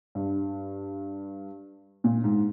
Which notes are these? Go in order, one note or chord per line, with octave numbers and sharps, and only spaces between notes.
G2
A#2
G#2